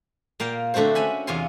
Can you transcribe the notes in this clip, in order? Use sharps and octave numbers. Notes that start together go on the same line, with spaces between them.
A#2 A#3 F5 G5
D3 A3 C4 F#4 C5
C#4 E5 G#5 B5
E2 C3 F4 G#5 C6